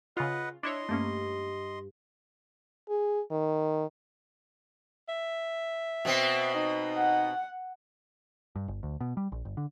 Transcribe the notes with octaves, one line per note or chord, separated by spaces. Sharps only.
C#3 F4 B4 D#5 F#5
D4 E4 C#5 D#5 C6
G2 A3 A#3 C#4
G#4
D#3
E5
B2 B3 C4
D#4
F#5
G2
G1
D2
B2
G3
A#1
G1
D3